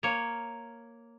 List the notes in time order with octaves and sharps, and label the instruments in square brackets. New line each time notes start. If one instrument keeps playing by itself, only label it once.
[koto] A#3 C#5